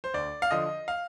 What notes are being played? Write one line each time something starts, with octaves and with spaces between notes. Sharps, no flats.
C5
D2 D5
F5
D3 F3 D#5
F5